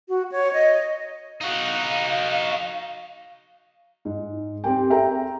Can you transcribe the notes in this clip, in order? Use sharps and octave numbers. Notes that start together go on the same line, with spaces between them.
F#4
C#5
D#5
D#4 F#4 F5
G#2
C4 G4 G5
G#4 A4 E5 G5 A#5